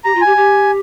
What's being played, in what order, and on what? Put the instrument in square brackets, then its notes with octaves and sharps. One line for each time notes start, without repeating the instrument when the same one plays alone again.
[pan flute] G4 [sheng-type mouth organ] A#5
[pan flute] F4
[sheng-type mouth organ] G#5
[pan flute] G4
G4